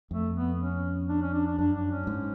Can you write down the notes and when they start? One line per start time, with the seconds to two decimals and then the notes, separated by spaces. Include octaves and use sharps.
0.11 F2 A3
0.35 B3
0.60 C#4
1.09 D4
1.22 C#4
1.33 D4
1.46 D4
1.58 F#2 D4
1.75 D4
1.91 C#4
2.07 G#2